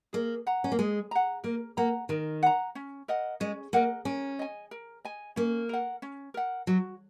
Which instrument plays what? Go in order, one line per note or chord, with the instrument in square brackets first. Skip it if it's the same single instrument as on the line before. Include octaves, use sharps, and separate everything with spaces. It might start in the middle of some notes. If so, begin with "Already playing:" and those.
[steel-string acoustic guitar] A#3 [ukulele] G#4
[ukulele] F#5 A#5
[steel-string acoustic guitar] C#4
A#3
[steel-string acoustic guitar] G#3 [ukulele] G#4
[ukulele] F#5 A#5
[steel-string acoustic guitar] A#3 [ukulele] A#4
[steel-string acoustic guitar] A#3 [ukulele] F#5 A#5
[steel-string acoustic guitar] D#3 [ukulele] A#4
[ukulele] F#5 A#5
C#4
A#4 D#5 F#5
[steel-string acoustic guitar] G#3 [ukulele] C#4
[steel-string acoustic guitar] A#3 [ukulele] A#4 D#5 F#5
[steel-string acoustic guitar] C#4 [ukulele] A#4
[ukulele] D#5 G#5
A#4
D#5 G#5
[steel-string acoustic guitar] A#3 [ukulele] C#4
[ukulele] A#4 F#5
C#4
A#4 F#5
[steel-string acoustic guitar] F#3 [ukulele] F#4